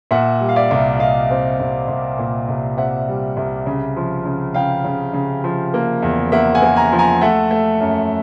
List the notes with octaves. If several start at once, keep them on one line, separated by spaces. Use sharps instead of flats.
A#2 E5 F#5
G3
F5
D5 E5
C2
C2 D#5 F5
C4
C2
C2
A#2
C2
C4 E5 F#5
G3
C2
C#3
F3
C#3
C#3 F5 G5
C#3
C#3
F3
A#3
E2
A#3 E5 F#5
F#5 G#5
A#3
G#5 A#5
F3
G#5 A#5
A3 E5 F#5
A3
F#2